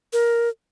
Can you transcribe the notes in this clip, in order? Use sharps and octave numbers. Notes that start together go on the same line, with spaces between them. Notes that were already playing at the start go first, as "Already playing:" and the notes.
A#4